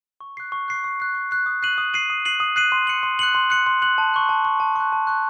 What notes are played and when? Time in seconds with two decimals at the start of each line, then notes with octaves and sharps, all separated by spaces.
0.21 C#6
0.37 F#6 C7
0.52 C#6
0.68 F#6 C7
0.84 C#6
1.00 F#6 C7
1.15 C#6
1.31 F#6 C7
1.46 D#6
1.63 F#6 C7 D#7 F#7
1.78 D#6
1.94 F#6 C7 D#7 F#7
2.10 D#6
2.25 F#6 C7 D#7 F#7
2.40 D#6
2.56 F#6 C7 D#7 F#7
2.72 C6
2.87 F#6 C#7 F#7
3.03 C6
3.19 F#6 C#7 F#7
3.35 C6
3.50 F#6 C#7 F#7
3.66 C6
3.82 F#6 C#7 F#7
3.98 A5
4.14 C#6 F#6
4.29 A5
4.45 C#6 F#6
4.60 A5
4.76 C#6 F#6
4.92 A5
5.07 C#6 F#6